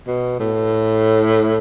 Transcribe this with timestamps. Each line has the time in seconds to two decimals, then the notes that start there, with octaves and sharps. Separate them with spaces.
0.07 B2
0.40 A2